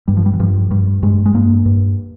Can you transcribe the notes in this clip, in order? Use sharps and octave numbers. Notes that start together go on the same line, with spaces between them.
G2 G3
F3
G3
E3
G2 F3
G2 G3
G2 G#3
G#3
G2 A#3
G2